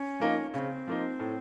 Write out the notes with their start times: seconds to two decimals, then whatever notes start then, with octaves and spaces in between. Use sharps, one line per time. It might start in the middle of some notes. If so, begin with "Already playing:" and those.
Already playing: C#4
0.20 F3 A#3 D#4
0.54 C#3 C#4
0.58 C4
0.87 F3 A#3 D#4
1.20 A2